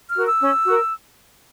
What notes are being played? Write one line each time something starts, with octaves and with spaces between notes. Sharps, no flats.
F6
F#4 A#4
E6
C#4
F#4 A#4